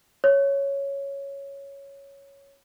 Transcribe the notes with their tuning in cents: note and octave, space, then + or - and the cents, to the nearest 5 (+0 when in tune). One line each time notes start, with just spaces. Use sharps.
C#5 +0